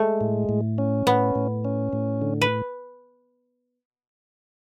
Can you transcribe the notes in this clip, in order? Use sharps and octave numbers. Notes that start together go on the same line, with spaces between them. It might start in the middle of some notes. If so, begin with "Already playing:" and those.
Already playing: G#3 A3
A2
A2
C#4
A2 B3
A2
C#4
A2
D3
B4